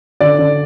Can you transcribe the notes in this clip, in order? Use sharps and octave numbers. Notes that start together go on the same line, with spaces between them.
D3 D5
D3